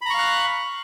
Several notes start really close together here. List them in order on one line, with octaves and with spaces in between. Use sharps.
B5 A#5 C#6 F5 F#6